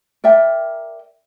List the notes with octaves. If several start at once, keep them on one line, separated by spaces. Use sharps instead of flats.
A#4 D5 E5 G5